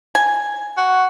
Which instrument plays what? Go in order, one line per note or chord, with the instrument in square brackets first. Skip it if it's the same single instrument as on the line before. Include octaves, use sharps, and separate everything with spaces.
[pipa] G#5
[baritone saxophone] F#4